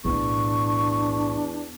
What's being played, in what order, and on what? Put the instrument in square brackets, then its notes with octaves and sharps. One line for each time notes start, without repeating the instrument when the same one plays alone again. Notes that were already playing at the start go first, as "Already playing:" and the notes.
[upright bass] B1 A2 [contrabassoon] E2 [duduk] D4 [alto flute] C#6